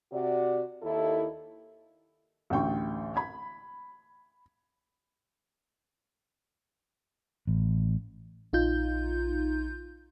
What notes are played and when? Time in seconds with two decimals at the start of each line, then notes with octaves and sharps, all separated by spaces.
0.12 C3 F#4 D5
0.83 D#2 E4 A4
2.50 A1 D2 G5 C#6
3.16 B5 G#6
7.47 A1
8.53 A#1 D#4 F4 G6